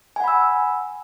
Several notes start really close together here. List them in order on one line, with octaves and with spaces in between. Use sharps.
G#5 F#5 B5 E6